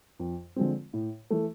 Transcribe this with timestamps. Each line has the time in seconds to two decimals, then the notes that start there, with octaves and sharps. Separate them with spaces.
0.19 F2
0.56 D3 F3 G#3 C4
0.93 A2
1.31 E3 A3